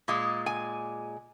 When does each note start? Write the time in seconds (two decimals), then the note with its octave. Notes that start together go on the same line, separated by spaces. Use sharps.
0.08 A#2 G#3
0.46 G#5